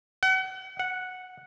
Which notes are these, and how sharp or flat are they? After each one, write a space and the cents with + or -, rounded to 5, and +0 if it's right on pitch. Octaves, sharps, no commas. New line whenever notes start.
F#5 +35
F#5 -5